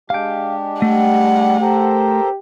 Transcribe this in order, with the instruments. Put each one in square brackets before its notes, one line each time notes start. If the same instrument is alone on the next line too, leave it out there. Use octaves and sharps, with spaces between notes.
[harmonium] G#3 D4 G4 [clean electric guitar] F5 G5
[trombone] G3 [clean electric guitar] A3 [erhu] F#5
[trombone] G4 [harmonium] A4 A#4 C5